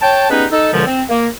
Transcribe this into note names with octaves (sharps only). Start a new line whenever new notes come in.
C#5 G5 A5
G3 G#3 B3 C#4 D#4 B4
D#4 A4
C#2 F#2 B2 D3 F3 G#3
C4
A#3